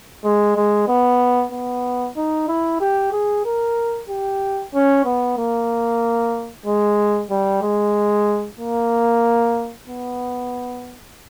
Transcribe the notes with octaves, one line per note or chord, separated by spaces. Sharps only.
G#3
G#3
B3
B3
D#4
E4
G4
G#4
A#4
G4
C#4
B3
A#3
G#3
G3
G#3
A#3
B3